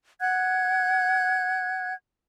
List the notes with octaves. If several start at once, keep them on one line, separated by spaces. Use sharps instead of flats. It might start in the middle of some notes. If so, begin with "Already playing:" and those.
F#5 F#6 G#6